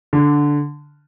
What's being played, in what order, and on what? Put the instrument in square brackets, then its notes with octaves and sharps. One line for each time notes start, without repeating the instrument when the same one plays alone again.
[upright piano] D3